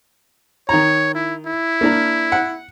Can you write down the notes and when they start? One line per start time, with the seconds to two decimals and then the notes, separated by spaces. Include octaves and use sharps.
0.69 D#3 C#5 A#5
1.15 E4
1.45 E4
1.81 A#3 D4 A#4
2.32 F#5